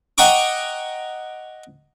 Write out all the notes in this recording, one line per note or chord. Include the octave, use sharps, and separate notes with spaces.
D#5 F#5 G5 A#5 C#6 D6